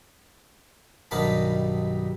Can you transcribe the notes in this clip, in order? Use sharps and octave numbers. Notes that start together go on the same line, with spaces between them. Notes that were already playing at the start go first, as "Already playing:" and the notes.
B1 G2 D#3 F5 A5 B5